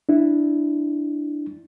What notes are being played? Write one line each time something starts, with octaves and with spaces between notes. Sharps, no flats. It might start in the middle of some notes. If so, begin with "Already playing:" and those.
D4 E4